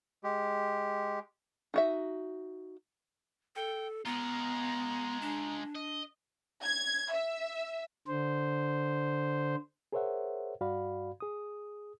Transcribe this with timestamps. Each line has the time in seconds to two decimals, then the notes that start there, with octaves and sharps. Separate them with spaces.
0.24 G#3 G4
1.74 D#4 F#4 E5
3.56 A4 G5
4.05 G#3 B3 F4 A#5
5.22 D4
5.75 D#5
6.64 G#6
7.12 E5
8.07 D3 C5
9.92 G#4 A#4 C5 C#5 E5 F#5
10.61 G2 F#4 D5 F5 B5
11.20 G#4 D#6